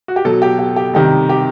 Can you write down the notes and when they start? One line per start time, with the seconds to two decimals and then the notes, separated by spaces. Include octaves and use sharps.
0.08 F#4
0.16 G4
0.25 B2 F#3 A4
0.42 G4
0.59 G4
0.76 G4
0.94 C3 D#3 G3 G4
1.29 G4